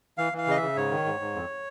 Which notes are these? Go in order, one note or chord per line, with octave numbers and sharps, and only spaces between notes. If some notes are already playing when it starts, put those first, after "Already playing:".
E3 F5
E3
F5
C#3 D#5
E5
C#3
G#2 C#5
D#3
G#2
G#2
F2